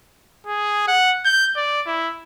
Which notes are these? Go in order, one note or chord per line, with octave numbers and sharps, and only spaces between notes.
G#4
F#5
G6
D5
E4